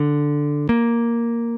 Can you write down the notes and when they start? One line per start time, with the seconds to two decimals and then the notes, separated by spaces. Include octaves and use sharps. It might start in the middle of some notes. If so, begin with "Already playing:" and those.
Already playing: D3
0.69 A#3